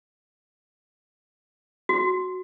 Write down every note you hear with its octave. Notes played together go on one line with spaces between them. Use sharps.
F#4